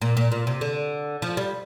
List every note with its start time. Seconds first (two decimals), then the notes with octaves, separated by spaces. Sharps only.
0.02 A#2
0.17 A#2
0.32 A#2
0.47 C3
0.61 D3
1.22 F3
1.37 G3